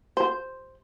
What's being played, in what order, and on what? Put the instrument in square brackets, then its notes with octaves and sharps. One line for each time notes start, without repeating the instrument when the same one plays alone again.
[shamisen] C5